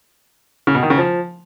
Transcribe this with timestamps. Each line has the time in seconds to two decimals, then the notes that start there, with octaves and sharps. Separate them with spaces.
0.67 C#3
0.75 B2
0.83 D#3
0.90 C#3
0.98 F3